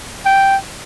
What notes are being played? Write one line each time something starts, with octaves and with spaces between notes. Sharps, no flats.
G5